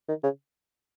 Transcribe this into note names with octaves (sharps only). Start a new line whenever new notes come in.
D#3
C#3